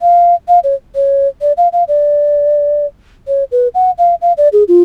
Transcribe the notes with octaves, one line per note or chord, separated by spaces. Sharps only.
F5
F5
C#5
C#5
D5
F5
F5
D5
C#5
B4
F#5
F5
F5
D5
G#4
F4